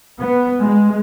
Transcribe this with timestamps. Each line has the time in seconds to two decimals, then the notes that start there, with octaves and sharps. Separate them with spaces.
0.22 B3
0.62 G#3